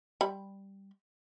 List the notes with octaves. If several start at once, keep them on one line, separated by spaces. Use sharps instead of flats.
G3 B5